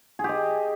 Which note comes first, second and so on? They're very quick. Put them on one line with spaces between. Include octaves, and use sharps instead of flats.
G#4 G4 D#5